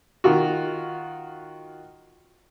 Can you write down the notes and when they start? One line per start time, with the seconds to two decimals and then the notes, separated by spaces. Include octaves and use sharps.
0.24 D#3 F4 F#4